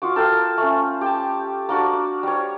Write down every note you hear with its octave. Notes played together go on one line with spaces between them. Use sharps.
F4 F#4 D6
A4 A#4 F5 G5
A3 C#4
G4 G5 A5
A#3 D4 F#4 D5
G3 C#5